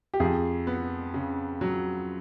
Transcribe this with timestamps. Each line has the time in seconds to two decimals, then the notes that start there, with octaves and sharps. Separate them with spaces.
0.14 G4
0.20 F2 G#4
0.67 B3
1.14 C#3
1.61 F#3